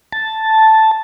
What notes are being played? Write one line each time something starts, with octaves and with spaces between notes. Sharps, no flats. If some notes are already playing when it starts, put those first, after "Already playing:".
A5